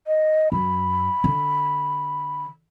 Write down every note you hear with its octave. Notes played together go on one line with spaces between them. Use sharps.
D#5
F#2 B5
D3